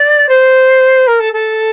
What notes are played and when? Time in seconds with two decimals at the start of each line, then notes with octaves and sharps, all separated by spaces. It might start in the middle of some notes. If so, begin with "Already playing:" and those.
Already playing: D5
0.29 C5
1.07 A#4
1.20 A4
1.33 A4